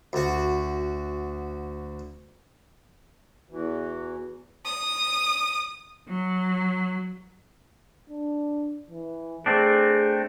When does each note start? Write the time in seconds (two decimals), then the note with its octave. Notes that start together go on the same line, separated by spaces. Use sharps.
0.13 D2 F#4
3.50 E2 E3 F#4
4.65 D#6
6.10 F#3
8.09 D4
8.90 E3
9.46 A3 C4 D4 G#4